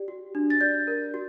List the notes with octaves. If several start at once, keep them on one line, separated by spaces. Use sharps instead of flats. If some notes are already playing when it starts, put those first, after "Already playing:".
Already playing: G4 D5
F#4
D4
A6
D5 G6
A#4
F#4